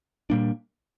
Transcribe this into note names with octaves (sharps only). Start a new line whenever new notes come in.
A#2 G3 A#3 D4